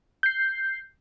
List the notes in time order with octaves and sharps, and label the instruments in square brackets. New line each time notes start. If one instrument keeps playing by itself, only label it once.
[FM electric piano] G6 C7